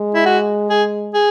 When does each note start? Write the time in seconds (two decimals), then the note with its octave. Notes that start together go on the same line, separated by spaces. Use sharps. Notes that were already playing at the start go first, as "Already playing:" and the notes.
Already playing: G#3
0.15 E4
0.26 F#4
0.70 G#4
1.14 G#4